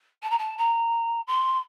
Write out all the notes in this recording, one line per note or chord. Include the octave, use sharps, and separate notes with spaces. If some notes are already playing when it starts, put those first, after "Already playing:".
A5
A#5
A5
A#5
C6